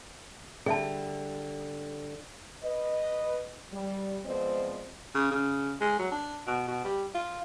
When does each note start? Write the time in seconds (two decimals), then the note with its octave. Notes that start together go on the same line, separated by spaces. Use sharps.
0.66 D3 G3 G#4 E5 A5
2.64 B4 D#5
3.72 G3
4.26 F3 G#3 B3 C4 D5 D#5
5.15 C#3
5.31 C#3
5.81 G#3
5.99 F#3
6.12 D4
6.47 B2
6.68 B2
6.84 G3
7.14 F4